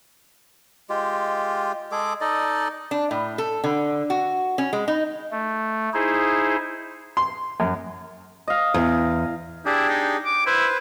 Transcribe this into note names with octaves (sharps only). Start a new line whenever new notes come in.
G#3 F4 G4
G#3 G#4 A4 D6
D#4 A4 D5 D#5
D4
A2
A4
D3
F#4
C#4
G#3
D#4
A3
D#4 E4 G#4 C5
C6
F#2
D#5 F5
E2
D4 E4 G4 G#4
D#4
D6
E4 B4 C5